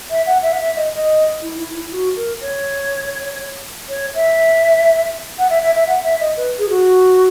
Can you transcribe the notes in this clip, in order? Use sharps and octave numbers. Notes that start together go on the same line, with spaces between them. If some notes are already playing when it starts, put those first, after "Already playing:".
E5
F#5
E5
F#5
E5
D#5
D#5
E4
E4
E4
F#4
A#4
C#5
C#5
E5
F#5
E5
E5
E5
F#5
E5
D#5
B4
G#4
F#4